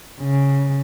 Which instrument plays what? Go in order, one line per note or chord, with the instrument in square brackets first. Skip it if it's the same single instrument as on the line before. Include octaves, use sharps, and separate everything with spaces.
[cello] C#3